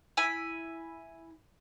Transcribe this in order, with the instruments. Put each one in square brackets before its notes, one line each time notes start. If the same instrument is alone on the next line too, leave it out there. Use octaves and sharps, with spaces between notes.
[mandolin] E4 G#5 B5